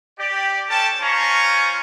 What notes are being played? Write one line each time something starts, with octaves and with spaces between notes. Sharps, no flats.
G4 D5
C#4 A4 G5 A5
C#4 F4 C5 G#5 A#5 C#6